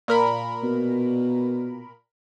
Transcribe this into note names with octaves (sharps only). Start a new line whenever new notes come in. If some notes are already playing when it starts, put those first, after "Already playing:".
A#2 A#4 B5
B2